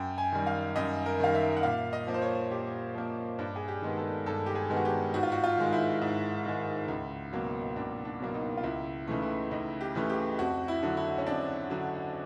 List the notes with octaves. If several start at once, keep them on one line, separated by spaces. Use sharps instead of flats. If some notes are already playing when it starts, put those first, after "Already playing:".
Already playing: F#2 G5
G#5
D#3 G3
F5
F#2 D#5
A#4
D#3 G3 F5
E5
F#5
A#2 F5
D#5
F3 A#3
C5
C#5
A#2 G4
F3 A#3
G2 D4
G#4
G4
D#3 G#3 B3
A4
G2 A4
G4
G#4
D#3 G#3 B3
F#4
G4
G#2 F#4
F4
F#4
F4
D#3 G#3
E4
G#2
D#3 G#3
C#2
B2 F#3 A#3
C#2 D4
D4
B2 F#3 A#3
D#4
F4
C#2 E4
C#3 E3 A3 D#4
E4
C#2 D#4
G4
C#3 E3 A3
G4
F2 F#4
E4
D3 F#3
E4
C#4
F2 D4
D3 F#3